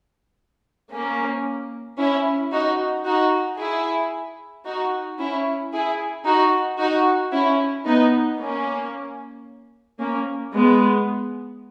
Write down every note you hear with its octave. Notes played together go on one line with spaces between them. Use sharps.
A#3 C#4
C#4 E4
D#4 F#4
D#4 F#4
E4 G#4
D#4 F#4
C#4 E4
E4 G#4
D#4 F#4
D#4 F#4
C#4 E4
B3 D#4
A#3 C#4
A#3 C#4
G#3 B3